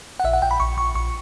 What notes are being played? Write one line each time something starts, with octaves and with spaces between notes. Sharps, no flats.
F#5
A#1 E5
F#5
A#1 G5
B5
A#1 C#6
A#1 C#6
A#1 C#6